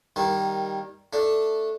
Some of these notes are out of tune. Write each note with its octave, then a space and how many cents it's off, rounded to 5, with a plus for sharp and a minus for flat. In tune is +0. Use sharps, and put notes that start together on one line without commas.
D#3 +0 G3 +0 A#3 +10
A3 +0 D4 +5